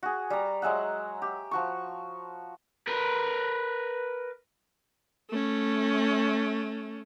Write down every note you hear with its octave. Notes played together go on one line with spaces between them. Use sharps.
F#4 G#4
G3 A#5
F#3 G#3 E5 F#5
G4
F3 F#4 C#6
A#4 B4
A3 C#4